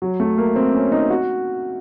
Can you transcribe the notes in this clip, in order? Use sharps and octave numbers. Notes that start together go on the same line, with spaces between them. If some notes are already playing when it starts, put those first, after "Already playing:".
F#3
A3
A#3
C4
C#4
D#4
F#4